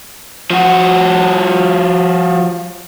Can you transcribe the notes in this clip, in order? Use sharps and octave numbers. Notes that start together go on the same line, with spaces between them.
F3 F#4